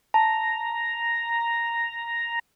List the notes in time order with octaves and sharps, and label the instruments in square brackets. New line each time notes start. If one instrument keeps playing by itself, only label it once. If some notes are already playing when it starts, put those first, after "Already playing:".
[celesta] A5 [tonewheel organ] A#5